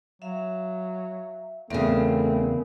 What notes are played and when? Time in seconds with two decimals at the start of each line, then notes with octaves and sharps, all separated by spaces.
0.22 F#3 E5 F5
1.70 E2 C#3 A3 B3 C4 A#4 D#6